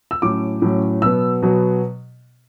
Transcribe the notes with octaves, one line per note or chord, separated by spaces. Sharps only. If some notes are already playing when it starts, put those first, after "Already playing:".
E6
A2 F#3 C#4 D6
A2 F#3 C#4
B2 F#3 B3 E6
B2 F#3 B3